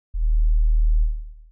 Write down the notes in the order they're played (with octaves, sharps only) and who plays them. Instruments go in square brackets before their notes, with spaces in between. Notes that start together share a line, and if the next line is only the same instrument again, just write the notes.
[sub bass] D#1